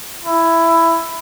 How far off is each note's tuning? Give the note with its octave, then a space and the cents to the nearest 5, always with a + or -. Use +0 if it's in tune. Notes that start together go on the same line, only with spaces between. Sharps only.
E4 +10